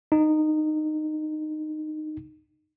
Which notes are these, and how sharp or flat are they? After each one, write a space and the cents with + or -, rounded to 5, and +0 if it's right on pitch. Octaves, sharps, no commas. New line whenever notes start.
D#4 -15